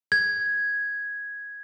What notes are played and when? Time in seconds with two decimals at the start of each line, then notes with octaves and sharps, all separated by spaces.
0.12 G#6